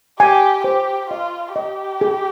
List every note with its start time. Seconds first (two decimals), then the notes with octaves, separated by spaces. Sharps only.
0.20 G4 G#5
0.64 G4 C5
1.10 F4 D#5
1.55 G4 D#5
2.01 G#4